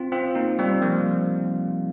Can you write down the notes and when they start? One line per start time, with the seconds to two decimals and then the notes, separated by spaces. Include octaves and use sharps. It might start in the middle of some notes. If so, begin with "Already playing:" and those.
Already playing: C4 F4
0.12 C4 F4
0.35 A#3 D#4
0.59 G3 C4
0.82 F3 A#3